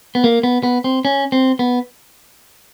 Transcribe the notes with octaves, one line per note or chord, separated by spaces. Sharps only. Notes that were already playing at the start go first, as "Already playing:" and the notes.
B3
A#3
B3
B3
C4
C#4
C4
B3